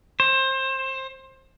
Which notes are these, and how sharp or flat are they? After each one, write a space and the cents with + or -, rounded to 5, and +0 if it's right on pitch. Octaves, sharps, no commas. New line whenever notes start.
C5 +25